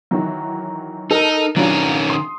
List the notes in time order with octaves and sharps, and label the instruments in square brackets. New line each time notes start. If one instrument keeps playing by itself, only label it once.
[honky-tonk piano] D#3 E3 F#3
[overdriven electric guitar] D#4 [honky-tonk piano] A4 A#4
[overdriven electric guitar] D#3 C#4 [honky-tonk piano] F#3 D4 F4
[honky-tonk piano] C6 D#6